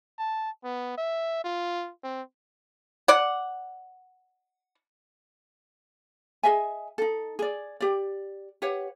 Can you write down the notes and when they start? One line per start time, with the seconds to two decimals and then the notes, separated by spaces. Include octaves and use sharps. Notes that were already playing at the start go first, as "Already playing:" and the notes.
0.18 A5
0.64 B3
0.98 E5
1.44 F4
2.04 C4
3.08 D5 F#5
6.43 G#4 D#5 E5 G#5
6.98 D#4 A4
7.39 G#4 D5
7.80 G4 D5
8.62 G4 B4 C#5 F#5